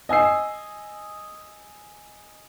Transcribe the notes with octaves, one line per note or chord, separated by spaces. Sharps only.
D#5 G#5 E6 C7